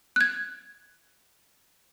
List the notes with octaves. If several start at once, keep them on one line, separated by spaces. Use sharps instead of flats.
F#6 G#6